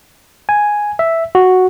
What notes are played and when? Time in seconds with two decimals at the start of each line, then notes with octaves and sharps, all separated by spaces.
0.49 G#5
0.99 E5
1.35 F#4